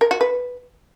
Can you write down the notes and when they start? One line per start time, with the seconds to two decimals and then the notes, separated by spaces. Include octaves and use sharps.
0.01 A#4
0.11 F#4
0.21 B4